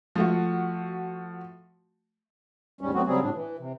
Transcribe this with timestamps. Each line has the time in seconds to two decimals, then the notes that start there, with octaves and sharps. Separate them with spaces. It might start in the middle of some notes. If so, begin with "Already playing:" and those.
0.15 F3 A3 F#4
2.81 D#2 G#2 G3 C#4
2.94 F#3 A3 B3 C4 F#4
3.07 C#3 F#3 G3 C4 G#4
3.23 A2 D4
3.34 E3
3.59 C3